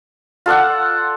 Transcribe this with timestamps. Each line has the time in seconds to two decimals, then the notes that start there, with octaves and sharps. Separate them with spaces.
0.46 F4 A4 D5 F#5